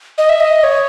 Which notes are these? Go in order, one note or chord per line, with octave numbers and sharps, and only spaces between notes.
D#5
E5
D#5
C#5